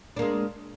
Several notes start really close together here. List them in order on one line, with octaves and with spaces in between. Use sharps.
D4 A#3 G#3